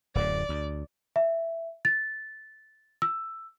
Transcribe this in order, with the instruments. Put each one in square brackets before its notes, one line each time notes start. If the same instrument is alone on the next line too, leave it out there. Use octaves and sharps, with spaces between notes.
[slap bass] D1 F#2 A2 [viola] D5
[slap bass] D2
[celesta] E5
A6
E6